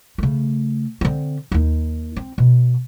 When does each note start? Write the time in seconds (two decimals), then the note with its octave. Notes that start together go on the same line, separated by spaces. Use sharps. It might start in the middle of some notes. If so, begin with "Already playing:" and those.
0.18 C#3 A3
1.01 D3 C4
1.52 D#2 D#4
2.16 C4
2.38 B2